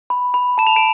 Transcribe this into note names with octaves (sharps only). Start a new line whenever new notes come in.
B5
B5
A5 E7
F7
D7 E7